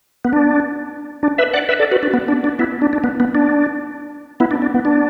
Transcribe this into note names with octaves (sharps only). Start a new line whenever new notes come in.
B3
D4
D4
B4 E5
D5 F#5
B4 E5
A4 D5
F#4 B4
D4
B3
D4
D4
B3 E4
D4
D4
B3
B3
D4
B3 E4
D4
D4
B3
D4